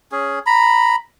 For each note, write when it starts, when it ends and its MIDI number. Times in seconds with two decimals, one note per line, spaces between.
0.12 0.39 61
0.12 0.39 68
0.46 0.96 82
0.46 0.96 83